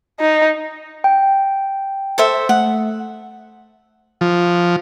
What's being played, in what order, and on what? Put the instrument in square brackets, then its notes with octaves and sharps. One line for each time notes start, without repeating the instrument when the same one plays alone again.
[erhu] D#4
[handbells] G5
[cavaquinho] A4 C5 E5
[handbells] A3 [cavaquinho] F#5
[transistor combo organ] F3